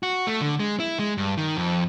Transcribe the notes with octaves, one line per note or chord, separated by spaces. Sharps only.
F#4
A3
D3
G#3
E4
G#3
G2
D#3
F2